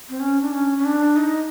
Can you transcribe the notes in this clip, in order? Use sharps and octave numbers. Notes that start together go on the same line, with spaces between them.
C4
C#4
D4
C#4
C#4
D4
D#4